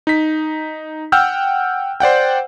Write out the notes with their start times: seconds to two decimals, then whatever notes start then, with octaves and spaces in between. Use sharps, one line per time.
0.07 D#4 B6
1.12 F#5 G5 E6 F6 G6
2.00 C5 D5 F#5 G5